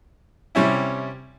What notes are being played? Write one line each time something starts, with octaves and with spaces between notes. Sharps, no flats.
C3 G3 C#4 E4